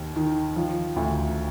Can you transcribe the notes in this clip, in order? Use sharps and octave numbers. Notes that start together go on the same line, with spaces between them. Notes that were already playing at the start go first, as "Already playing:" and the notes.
Already playing: D#2
D#3
F3
D2